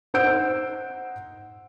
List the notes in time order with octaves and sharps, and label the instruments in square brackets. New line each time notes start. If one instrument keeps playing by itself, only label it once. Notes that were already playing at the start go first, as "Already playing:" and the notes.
[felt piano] D#4 C5 F#5 E6 G6 D7